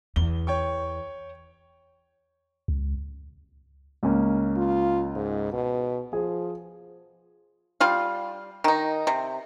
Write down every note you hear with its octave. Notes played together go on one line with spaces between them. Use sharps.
E2 G7
C#5 G5 C#6
C#2
C#2 A#3 C#4
F4
G#2
B2
F3 G#4
G3 F4 F5
D#3 D#4
C3